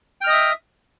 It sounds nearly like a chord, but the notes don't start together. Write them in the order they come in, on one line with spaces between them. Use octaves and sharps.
G5 F6 D#5 D#6 E5